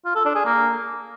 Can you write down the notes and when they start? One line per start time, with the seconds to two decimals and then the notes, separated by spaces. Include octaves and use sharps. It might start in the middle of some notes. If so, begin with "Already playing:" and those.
0.05 F4
0.15 A4
0.25 D4
0.35 G#4
0.45 A#3